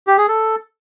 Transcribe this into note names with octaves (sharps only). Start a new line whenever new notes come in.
G4
G#4
A4